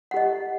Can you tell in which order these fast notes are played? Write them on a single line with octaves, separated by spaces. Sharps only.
F#5 G4 D#5